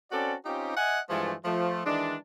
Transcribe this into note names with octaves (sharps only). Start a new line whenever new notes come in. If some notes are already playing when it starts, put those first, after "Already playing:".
C4 C#4 F#4 A4 D5
C4 C#4 D#4 F4 G4
D#5 E5 F#5 G#5
G2 E3 F3 G#3 A3
F3 A3
D#3 E3 G#3 D4